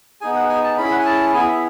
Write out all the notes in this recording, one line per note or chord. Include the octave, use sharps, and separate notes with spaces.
B3 D#4 G#4 G#5
F#5
G#5
A5
C#4 E4 G#4 B5
F#5
G#5
A5
B3 E4 G#4 G#5
E5